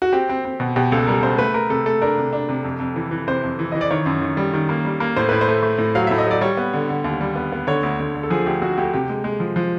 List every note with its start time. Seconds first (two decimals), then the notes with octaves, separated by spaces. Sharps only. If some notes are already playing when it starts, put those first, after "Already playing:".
0.02 F#4
0.13 C4 G4
0.29 C4
0.45 C4
0.60 B2
0.76 B2 G4
0.92 C#2 A4
1.07 G3 A#4
1.23 C#2 C5
1.38 A3 B4
1.54 A3 A#4
1.70 C3 A4
1.86 A3 A4
2.01 D4 A#4
2.18 C3
2.33 D4
2.49 C3
2.64 F2
2.80 F2
2.96 E3
3.11 E3
3.27 C3 C5
3.44 F2
3.59 E3
3.72 E3 D#5
3.81 D5
3.91 D#3 C#5
4.06 F#2
4.21 D#3
4.37 G3
4.54 D#3
4.69 A#3
4.85 G3
5.00 A#3
5.16 A2 C5
5.29 A2 B4
5.41 C5
5.48 A3
5.63 A3
5.78 A2
5.95 F#3 F5
6.07 A2 E5
6.18 D#5
6.27 F#3 D5
6.41 G3 C#5
6.57 B3
6.73 D3
6.89 D3
7.04 D#2
7.21 G3
7.36 B3
7.52 B3
7.67 D3 C#5
7.83 D2
7.99 D2
8.15 D3
8.23 A4
8.30 F3 G#4
8.46 D2 G4
8.62 D2 F#4
8.78 D2 G4
8.93 C3 G4
9.09 G#3
9.24 G#3
9.40 F3
9.56 F3